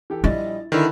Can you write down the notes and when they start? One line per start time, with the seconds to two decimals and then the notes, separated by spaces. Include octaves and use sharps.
0.10 E3 G4 A4
0.24 A#1 G3 E4 D#5 A6
0.72 D3 D#3 E4 A4 B4 D5